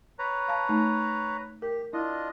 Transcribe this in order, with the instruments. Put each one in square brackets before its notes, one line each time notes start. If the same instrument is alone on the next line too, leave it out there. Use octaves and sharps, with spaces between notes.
[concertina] B4 C#5 A#5
[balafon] F5 A5
A3 D#4 A5
[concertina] G4 [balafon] A#4
[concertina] D4 F4 D#5 [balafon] E4